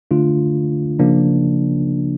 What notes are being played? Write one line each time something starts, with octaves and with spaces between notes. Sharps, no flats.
D3 A3 D4 F4
C#3 F3 A#3 D4